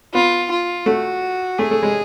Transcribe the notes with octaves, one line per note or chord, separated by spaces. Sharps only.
B3 F4
F4
A3 F#4
A3 G#4
A3
G#3